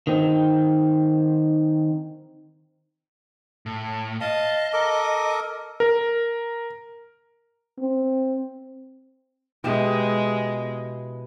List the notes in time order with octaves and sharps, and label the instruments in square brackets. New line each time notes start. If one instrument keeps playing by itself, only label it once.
[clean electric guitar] D#3 C4
[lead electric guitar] A2
[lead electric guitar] D#5 [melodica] F5 A5
[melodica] A4 A#4 D6
[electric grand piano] A#4
[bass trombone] C4
[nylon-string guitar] B2 E4 G4 [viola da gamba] G#3